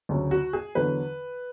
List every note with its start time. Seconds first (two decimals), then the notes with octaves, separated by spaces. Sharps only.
0.09 D2 C#3 F#3
0.31 F#4
0.53 G#4
0.75 E2 D3 F#3 B4